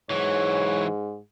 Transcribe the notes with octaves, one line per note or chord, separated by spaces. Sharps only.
G#2 E3 F#3 C#5